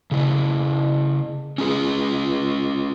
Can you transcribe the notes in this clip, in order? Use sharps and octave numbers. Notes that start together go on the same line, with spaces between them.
C#3 E4
C#4 F4 G#4